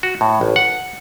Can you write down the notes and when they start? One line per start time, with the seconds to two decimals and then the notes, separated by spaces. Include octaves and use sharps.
0.03 F#4
0.21 A2
0.41 A1
0.56 F#5